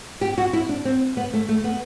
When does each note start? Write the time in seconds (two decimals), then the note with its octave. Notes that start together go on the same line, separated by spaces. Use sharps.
0.21 G4
0.38 F#4
0.53 E4
0.69 D4
0.85 C4
1.17 B3
1.34 A3
1.49 A3
1.64 B3